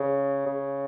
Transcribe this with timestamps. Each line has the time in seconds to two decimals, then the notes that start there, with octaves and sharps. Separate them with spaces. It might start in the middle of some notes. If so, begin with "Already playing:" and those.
Already playing: C#3
0.46 C#3